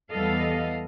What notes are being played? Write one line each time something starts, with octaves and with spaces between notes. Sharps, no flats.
E2 G3 B3 A4 D#5 F5